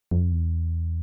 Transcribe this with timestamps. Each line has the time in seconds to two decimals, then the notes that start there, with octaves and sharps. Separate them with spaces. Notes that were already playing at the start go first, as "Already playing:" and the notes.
0.11 F2
0.32 E2